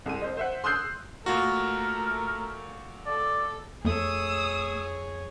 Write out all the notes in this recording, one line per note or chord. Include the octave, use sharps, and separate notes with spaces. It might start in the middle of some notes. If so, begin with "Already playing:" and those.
C2 G#3 D#7
C5 D#5
C5 E5 F#5
C6 D#6 E6 F#6 G6 C7
A#2 A3 F4 F#4 A#4
A4 D5
F2 A3 G#4 C#5 D#6 E6